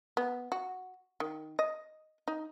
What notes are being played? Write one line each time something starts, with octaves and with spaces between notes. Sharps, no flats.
B3
F#4
D#3
D#5
D#4